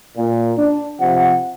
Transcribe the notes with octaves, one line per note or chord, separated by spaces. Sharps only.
A#2
D4
C3 F3 F#5